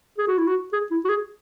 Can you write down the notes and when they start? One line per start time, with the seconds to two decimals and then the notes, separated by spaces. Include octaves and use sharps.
0.18 G#4
0.28 F#4
0.38 E4
0.47 F#4
0.73 G#4
0.91 E4
1.05 F#4
1.09 G#4